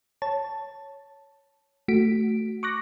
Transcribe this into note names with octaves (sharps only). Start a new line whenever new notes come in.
C#5 A5
A3 F#4 B6 D7
C#6 D6 F#6 A#6